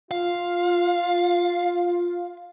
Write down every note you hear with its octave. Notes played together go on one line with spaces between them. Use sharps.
F4 F5